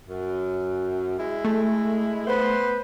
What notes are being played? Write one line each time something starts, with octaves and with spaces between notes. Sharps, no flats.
F#2
G#3 E4
A3
B3 B4 C5